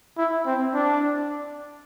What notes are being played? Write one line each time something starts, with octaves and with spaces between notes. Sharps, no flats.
E4
C4
D4